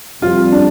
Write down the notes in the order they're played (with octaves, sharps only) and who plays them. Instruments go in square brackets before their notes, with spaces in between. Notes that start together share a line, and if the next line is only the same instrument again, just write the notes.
[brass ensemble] F2 C3 G3 [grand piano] F4
[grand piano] D4